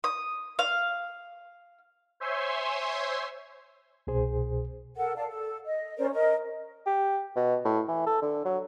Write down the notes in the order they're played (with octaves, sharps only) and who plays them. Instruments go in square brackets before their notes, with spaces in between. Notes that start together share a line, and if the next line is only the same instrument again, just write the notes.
[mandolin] D#6
F5
[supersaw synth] C5 C#5 E5 G#5 C6
[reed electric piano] C2 B2 G#4 C5
[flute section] A4 A#4 F#5
D5 F5 A5
A4
D#5
C#4 A#4 C5 D5
A#4 D#5
[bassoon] G4
B2
A2
E3
A4
D3
F#3